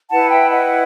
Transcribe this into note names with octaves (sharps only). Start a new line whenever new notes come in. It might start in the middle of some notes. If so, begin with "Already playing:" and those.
E4 B4 F#5 A5
E5 G5
D#5 F#5